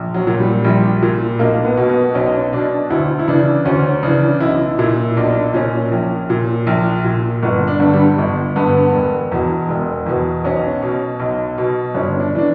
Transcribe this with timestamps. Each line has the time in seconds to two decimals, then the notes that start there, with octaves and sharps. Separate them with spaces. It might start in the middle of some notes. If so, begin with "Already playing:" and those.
Already playing: A#1
0.14 F#3
0.27 A#2
0.39 G3
0.64 A#1 G3
1.02 A#2
1.39 B1 A#3
1.65 B3
1.77 B2
1.89 B3
2.14 B1 C#4
2.53 B2 D4
2.90 D2 E4
3.19 E4
3.27 C#3 E3 D4
3.65 D2 C#4
4.03 C#3 E3 D4
4.40 B1 E4
4.79 A#2 E4
5.17 B1 D4
5.54 A#2 C#4
5.92 A#1
6.30 A#2
6.67 A#1
7.04 A#2
7.42 G1 B3
7.68 D4
7.80 G2 D3
7.94 G3
8.18 G1
8.56 G2 D3 B3
8.93 E1
9.32 E2 B2
9.69 E1
10.06 E2 B2
10.44 B1 C#4
10.83 B2
11.20 B1
11.58 B2
11.94 G1 C#4
12.20 D4
12.35 E3 D4